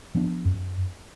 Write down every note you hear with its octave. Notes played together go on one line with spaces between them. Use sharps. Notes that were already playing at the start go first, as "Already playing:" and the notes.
F3 B3 D4
F#2